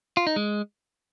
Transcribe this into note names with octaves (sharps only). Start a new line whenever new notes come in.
F4
D#4
G#3